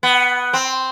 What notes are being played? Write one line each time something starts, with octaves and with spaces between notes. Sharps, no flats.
B3
C4